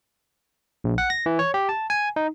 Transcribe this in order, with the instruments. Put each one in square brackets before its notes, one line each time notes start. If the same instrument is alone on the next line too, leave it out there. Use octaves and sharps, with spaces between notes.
[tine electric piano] A#1
F#5
A#6
E3
C#5
G4
A5
G#5
D#4